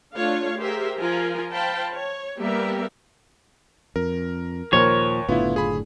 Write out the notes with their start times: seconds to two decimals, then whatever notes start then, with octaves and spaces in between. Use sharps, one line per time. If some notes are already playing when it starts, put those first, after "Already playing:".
0.14 A3 D4 F4 C#5 F5
0.57 G4 G#4 A#4 C5 E5
0.98 F3 F4 A#4 G#5
1.52 C5 F5 G5 A5 B5
1.92 C#5
2.39 G3 A#3 B3 G4 A#4 E5
3.96 F2 A#4
4.73 D#2 A#2 F3 A#4 C5 C#5
5.29 F#1 A2 D3 B3 E4 F4
5.56 G#4 B5